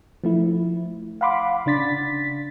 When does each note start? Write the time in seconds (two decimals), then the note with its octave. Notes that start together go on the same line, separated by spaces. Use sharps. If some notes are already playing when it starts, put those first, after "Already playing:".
0.24 F3 A3 E4
1.21 F5 F#5 B5 C6 D6
1.66 C#3 D4 A6 B6